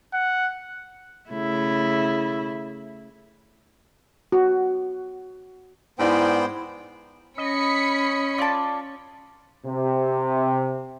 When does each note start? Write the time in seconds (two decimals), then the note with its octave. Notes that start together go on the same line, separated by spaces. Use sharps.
0.14 F#5
1.30 C#3 A3 E4
4.32 F#4
5.99 G#2 B3 E4 C5 D5 G5
7.38 C#4 D#5 B5 B6 C#7
8.38 F4 D5 A5
9.66 C3